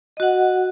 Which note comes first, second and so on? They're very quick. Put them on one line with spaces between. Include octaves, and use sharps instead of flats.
D#5 F#4 F#5